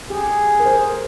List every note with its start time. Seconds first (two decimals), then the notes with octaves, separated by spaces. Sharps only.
0.10 G4 G#4
0.59 A#4
0.65 C5